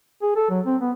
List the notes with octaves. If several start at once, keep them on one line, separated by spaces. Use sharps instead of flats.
G#4
A4
F#3
C4
B3